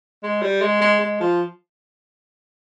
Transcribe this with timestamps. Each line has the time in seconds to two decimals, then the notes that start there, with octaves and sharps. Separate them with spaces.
0.23 G#3
0.42 G3
0.62 G#3
0.81 G#3
1.01 G#3
1.20 F3